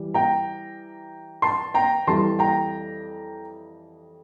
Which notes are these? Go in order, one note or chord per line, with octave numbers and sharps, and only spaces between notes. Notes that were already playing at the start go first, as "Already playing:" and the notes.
Already playing: E3 G3
G5 A#5
A5 C6
G5 A#5
F2 E3 G3 A5 C6
G5 A#5